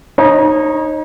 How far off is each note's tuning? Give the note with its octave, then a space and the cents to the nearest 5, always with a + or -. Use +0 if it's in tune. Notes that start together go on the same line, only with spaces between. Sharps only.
D#4 -10 C#5 -40 A#5 +40